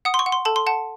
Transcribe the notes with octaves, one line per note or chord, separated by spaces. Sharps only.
F#5 D#6
C6
C#6
F#5
C6
A4 A5
C6
F#5 A5